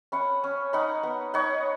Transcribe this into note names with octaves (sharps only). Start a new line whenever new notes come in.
C#4 F#5 B5
C#4
D#4 F#5 B5
B3
D#4 C#5 F#5